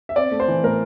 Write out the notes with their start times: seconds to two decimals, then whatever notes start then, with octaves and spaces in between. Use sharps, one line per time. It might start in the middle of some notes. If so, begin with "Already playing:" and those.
0.09 E5
0.16 C4 D5
0.31 A3
0.40 C5
0.48 E3
0.63 A2 A#4